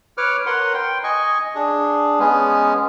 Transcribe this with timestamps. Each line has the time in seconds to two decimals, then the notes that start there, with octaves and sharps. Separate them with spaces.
0.17 B4 C#5 D6 F6
0.46 A#4 B4 C#5 F#5 C6
0.74 G5 C6
1.04 D#5 G#5 C#6
1.55 D4 G#4
2.19 G#3 B3 C#4